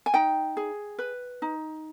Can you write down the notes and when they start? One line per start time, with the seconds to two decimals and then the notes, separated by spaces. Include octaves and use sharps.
0.06 G#5
0.14 D#4 G5
0.57 G#4
0.98 B4
1.42 D#4